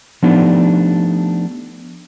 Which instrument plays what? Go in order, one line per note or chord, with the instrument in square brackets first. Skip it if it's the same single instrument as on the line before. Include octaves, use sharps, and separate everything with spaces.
[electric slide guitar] F3 A3 B3 D4 D#4 G4